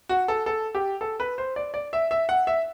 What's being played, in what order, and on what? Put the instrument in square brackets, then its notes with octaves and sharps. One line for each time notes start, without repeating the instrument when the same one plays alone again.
[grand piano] F#4
A4
A4
G4
A4
B4
C5
D5
D5
E5
E5
F#5
E5